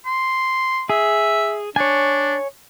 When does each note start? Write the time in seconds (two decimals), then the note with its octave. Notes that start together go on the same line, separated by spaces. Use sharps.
0.06 C6
0.89 G#4 E5
1.76 D4 C#5 G#5